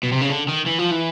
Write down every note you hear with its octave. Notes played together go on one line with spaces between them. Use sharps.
B2
C3
C#3
D3
D#3
E3
F3
E3